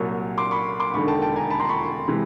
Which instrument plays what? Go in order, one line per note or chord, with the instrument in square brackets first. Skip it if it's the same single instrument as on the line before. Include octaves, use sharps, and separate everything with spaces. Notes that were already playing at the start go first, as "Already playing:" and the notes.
Already playing: [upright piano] C2 A#2 F#3 C#6
C6 D6
B5 C#6
C6 D6
E1 D#2 D3 B5 C#6
G5 A5
G5 A5
G#5 A#5
A5 B5
A#5 C6
B5 C#6
C3 E3 G#3